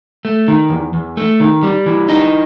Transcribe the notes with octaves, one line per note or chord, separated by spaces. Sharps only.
A3
D#3
E2
E2
A3
D#3
G3
E3
D#4